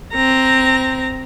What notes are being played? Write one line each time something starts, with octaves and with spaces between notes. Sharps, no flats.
C4 A#5